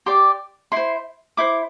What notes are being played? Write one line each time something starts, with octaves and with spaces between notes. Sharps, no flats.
G4 D5 C6
E4 C5 C6
E4 C5 D6